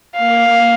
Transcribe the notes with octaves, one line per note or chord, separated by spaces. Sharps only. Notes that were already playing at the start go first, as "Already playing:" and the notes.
A#3 F5